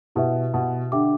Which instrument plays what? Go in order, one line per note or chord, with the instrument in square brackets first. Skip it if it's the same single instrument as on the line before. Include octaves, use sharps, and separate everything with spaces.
[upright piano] B2 [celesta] E4 G4 B4 E5
[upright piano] B2
[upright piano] D3 [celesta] G4 E5 G5 D6